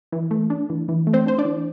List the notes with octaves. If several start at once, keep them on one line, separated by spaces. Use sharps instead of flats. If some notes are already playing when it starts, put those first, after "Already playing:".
E3
A3
D4
E3
E3
A3
C4 C5
D4 C5
D4 D5
E3